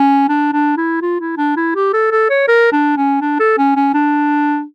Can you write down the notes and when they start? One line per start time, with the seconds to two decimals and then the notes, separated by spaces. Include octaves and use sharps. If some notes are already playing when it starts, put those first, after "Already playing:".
Already playing: C#4
0.29 D4
0.53 D4
0.77 E4
1.02 F4
1.20 E4
1.38 D4
1.57 E4
1.75 G4
1.94 A4
2.11 A4
2.30 C#5
2.48 A#4
2.72 D4
2.97 C#4
3.21 D4
3.39 A4
3.58 C#4
3.76 C#4
3.94 D4